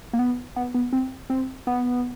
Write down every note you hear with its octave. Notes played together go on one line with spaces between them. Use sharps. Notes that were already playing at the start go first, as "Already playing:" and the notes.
A#3
B3
B3
B3
C4
C4
B3